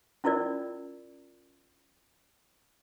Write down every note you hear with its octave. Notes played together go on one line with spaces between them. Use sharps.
C#4 E4 F4 A#4 D5